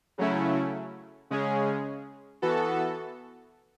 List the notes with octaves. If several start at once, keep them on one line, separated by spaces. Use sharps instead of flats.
C#3 F#3 A3 C#4 E4
C#3 G#3 C#4 G#4
E3 B3 F#4 A4